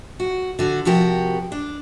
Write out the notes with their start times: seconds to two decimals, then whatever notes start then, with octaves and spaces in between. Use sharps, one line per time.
0.20 F#4
0.59 D3 F#4
0.85 C3 F3 F#4 G4 A#4
1.52 D4